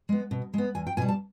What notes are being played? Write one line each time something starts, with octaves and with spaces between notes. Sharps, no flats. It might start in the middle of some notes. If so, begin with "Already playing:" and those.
G#3 B3
B2
G#3 B3
E2 G#5
G5
B2 G3 G#5
A5